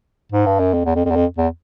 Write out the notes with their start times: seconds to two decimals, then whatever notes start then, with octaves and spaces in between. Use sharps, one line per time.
0.32 G#2
0.46 G2
0.60 F#2
0.74 F2
0.85 E2
0.96 F2
1.06 F2
1.11 E2
1.16 F2
1.38 E2